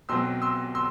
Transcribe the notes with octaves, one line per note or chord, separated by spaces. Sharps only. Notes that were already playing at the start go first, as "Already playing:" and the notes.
B1 B2 F#3 C4 C6 E6
C6 E6
C6 E6